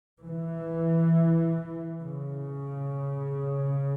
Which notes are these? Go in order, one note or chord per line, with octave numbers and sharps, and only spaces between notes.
E3
C#3